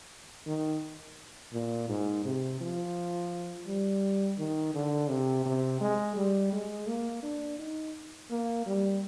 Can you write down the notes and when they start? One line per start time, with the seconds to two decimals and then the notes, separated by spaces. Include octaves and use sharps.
0.47 D#3
1.53 A#2
1.89 G#2
2.25 C3
2.61 F3
3.67 G3
4.38 D#3
4.75 D3
5.09 C3
5.46 C3
5.81 G#3
6.16 G3
6.52 G#3
6.87 A#3
7.23 D4
7.59 D#4
8.31 A#3
8.66 G3